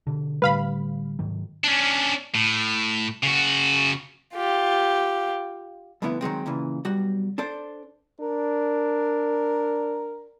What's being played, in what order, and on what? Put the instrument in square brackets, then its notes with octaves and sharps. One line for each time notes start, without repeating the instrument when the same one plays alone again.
[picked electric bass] B2 D3
[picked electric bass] A2 D3 G3 [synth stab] B4 F5 B5
[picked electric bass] G#2 D#3 F#3
[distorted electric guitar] C#4 D4
A2
C#3 F#4
[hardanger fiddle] F4 G4
[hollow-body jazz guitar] F2 A2 D3 B3 E4
D#3 F#3 G#3 C4
A#2 C#3 E3
B1 G3 F#4
D4 A4 C5 D5
[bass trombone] D4 [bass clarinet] A#4